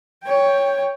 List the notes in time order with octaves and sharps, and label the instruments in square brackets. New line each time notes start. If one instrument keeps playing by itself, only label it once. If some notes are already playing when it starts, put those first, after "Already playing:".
[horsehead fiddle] C#5 G5